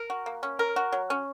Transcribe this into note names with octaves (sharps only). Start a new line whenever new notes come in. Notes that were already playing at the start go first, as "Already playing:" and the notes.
Already playing: A#4
F#4
A#3
C#4
A#4
F#4
F#3
C#4